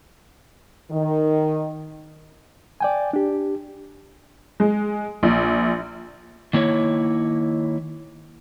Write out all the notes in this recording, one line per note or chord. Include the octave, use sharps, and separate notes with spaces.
D#3
D5 G5 G#5
D4 G4
G#3
A#1
D#3 A#3 E4 C#5